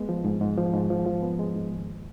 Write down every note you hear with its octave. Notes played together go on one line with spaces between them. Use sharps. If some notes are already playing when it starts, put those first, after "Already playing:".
Already playing: G#3 B3
F3
G#2
G#2
F3
G#2
F3
F3
B3
G#3
G#2
D#2